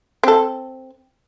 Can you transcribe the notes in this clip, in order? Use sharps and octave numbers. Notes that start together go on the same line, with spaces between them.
C4 A4